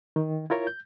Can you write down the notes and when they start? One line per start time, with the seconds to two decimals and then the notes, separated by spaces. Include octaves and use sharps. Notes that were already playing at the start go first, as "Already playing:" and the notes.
0.16 D#3
0.50 E4 F4 A#4 C#5
0.67 G6